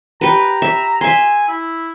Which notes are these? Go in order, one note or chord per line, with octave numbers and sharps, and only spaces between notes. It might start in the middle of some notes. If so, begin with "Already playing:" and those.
G4 B4 A#5
E5
E5 G#5 C6
E4